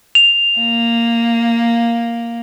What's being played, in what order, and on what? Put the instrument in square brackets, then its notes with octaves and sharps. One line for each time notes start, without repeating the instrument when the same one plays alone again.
[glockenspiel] F7
[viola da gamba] A#3